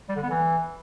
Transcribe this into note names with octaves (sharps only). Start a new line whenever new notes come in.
G3
D3
B3
E3